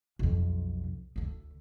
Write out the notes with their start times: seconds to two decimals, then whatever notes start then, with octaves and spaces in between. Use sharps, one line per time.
0.19 B1 F2
1.16 D2 D3